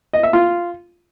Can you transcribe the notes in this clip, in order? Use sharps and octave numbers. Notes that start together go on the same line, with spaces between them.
D#5
E5
F4